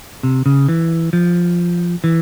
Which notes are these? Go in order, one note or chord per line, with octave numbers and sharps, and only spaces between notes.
C3
C#3
E3
F3
E3